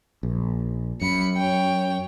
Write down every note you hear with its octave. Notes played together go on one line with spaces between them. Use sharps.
A#1
F#2 B5 C#7
C#5 G5